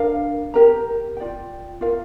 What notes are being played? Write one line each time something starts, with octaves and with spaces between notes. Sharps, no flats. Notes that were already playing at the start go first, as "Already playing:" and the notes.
Already playing: D4 A#4 F5
G4 A#4 G5 A#5
F4 D5 G5
F4 A#4 F5